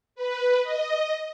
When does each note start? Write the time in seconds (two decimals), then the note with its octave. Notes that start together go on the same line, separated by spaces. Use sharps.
0.15 B4
0.63 D#5